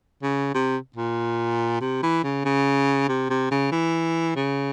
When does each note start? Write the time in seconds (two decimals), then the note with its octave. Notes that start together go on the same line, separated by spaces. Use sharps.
0.23 C#3
0.55 C3
0.96 A#2
1.81 C3
2.03 E3
2.24 C#3
2.45 C#3
3.09 C3
3.30 C3
3.51 C#3
3.72 E3
4.36 C#3